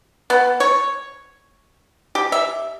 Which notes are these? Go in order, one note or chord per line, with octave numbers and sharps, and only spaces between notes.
B3
C#5
G4
E5